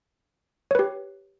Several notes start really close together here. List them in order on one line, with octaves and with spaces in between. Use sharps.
C#5 B4 G4